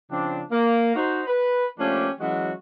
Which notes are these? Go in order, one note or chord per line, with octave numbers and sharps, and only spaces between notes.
C#3 F3 C4 D4
A#3
D#4 F#4 C5
B4
F3 A3 A#3 C#4 D4 G4
E3 F#3 G#3 C#4 F#4